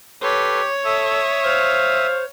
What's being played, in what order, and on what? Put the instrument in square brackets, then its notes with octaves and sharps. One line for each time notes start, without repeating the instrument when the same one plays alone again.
[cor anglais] G4 [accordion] A4 B4 C6 [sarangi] C#5
[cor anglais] A4 [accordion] E5 D#6 E6
[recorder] C5 [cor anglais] F5